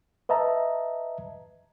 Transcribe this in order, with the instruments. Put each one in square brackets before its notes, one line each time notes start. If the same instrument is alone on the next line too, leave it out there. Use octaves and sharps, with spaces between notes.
[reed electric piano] B4 D#5 E5 A5 A#5